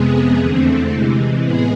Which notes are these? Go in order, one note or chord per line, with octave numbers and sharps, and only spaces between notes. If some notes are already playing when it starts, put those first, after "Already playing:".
Already playing: F2 C3 G#3 B3 G#4
E2 D3 A3 C4
C3 E3 G#3
A2 G#3 B3 G#4